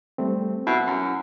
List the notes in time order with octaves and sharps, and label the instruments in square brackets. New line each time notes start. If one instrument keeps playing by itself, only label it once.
[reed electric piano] G3 A3 C4
[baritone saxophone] B2 [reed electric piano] E4 E6
[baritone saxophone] F#2